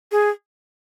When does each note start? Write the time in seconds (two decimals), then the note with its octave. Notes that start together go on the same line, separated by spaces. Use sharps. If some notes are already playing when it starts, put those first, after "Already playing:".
0.12 G#4